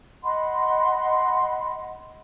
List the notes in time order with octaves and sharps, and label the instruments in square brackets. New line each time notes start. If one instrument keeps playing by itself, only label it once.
[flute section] D#5 F#5 B5 C6